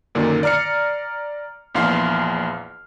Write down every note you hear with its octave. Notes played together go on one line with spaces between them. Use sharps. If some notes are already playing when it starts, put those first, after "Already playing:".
F#2 A#2 D3 D#3
D5 A#5 F6 C7 C#7
A#1 E2 F5 C6 F6 C7